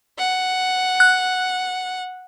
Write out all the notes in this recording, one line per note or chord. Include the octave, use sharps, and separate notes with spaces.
F#5
F#6